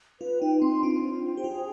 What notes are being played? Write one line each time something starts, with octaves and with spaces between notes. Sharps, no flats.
F4 B4
D#4 G5
C4 C6
D4 F4
C5
G5
G4
F4 G#4